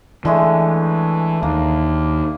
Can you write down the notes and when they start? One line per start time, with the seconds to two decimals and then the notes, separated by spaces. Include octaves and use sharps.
0.25 D3 E3 G#3 A3
1.43 D#2 A#3